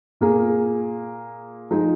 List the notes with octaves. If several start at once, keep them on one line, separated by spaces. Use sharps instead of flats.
A#2 A#3 G#4
F3 G#3 D#4 G#4